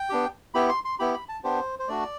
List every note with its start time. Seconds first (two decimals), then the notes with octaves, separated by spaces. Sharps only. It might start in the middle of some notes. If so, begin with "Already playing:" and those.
Already playing: G5
0.10 B3 D4 G4
0.54 B3 E4 G4 B5
0.69 C6
0.85 C6
0.99 B3 E4 G4 B5
1.14 B5
1.29 A5
1.44 B3 D4 G4 C5
1.79 C5
1.88 A3 D4 F#4 D5